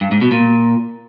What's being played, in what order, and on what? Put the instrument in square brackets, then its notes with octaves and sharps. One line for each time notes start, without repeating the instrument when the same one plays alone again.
[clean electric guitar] G2
G#2
B2
A#2